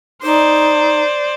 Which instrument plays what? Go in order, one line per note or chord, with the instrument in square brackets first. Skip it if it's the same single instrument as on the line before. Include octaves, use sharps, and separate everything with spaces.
[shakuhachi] D#4 [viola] C5 D5